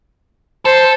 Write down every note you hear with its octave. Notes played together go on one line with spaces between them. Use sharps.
A4 C5